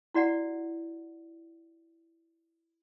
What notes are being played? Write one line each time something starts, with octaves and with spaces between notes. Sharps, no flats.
E4 F#4 D5 F#5